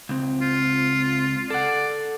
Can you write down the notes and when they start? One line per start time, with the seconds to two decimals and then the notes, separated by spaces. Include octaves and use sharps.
0.09 C#2 C4
0.41 F4
1.50 A4 D5 F#5